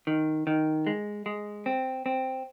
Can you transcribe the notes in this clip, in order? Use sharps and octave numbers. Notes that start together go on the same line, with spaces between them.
D#3
D#3
G#3
G#3
C4
C4